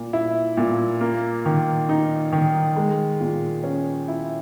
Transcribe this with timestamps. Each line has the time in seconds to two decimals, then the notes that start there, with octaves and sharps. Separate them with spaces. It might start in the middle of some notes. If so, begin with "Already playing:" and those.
Already playing: A#2 A#3
0.13 E4
0.57 A#2
1.01 A#3
1.46 D#3
1.89 D#4
2.33 D#3
2.77 G#3
3.20 A#2
3.64 C#4
4.08 E4